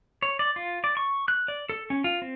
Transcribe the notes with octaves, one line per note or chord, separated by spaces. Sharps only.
C#5
D5
F4
D5
C#6
F#6
D5
A4
C#4
F4
C4